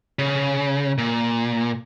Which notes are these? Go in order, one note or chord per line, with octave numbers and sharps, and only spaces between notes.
C#3
A#2